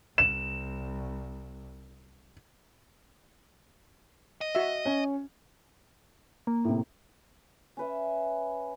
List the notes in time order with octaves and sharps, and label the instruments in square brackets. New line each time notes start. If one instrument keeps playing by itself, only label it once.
[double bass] C2 [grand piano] E7
[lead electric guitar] D#5
[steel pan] F#4 E5
[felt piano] C#4
[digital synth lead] A#3
[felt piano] A2 C3
[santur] C#4 B4 E5